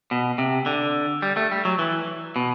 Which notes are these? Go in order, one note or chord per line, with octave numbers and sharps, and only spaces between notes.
B2
C3
D3
G3
A3
G3
F#3
E3
B2